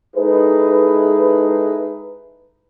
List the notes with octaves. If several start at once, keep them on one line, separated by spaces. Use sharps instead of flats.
G#3 D#4 E4 G#4 A4 B4